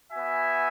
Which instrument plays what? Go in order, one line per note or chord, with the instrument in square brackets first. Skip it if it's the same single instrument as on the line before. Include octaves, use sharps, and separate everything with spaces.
[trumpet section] B3 F#4 E5 G#5